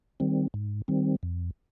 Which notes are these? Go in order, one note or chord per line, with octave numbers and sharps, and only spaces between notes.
D#3 G3 C4
G#2
D#3 G3 C4
F2